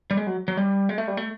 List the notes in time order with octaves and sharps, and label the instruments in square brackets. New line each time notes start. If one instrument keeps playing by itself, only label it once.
[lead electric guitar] G3
G#3
F#3
F#3
G3
G#3
A3
G3
A3